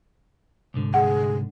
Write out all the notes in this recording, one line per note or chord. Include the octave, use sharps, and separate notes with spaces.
C2 G#2 D3
G#4 F#5